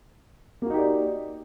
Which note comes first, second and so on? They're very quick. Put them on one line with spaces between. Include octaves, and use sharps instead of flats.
A#3 F#4 D#4 G4 D5